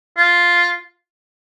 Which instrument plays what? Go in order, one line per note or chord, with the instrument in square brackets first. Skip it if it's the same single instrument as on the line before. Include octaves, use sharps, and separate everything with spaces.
[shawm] F4